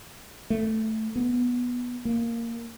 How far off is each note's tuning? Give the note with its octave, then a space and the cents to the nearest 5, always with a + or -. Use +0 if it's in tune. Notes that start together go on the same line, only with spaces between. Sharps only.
A3 +0
B3 -10
A#3 -5